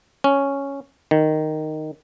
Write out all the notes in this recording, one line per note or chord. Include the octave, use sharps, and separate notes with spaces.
C#4
D#3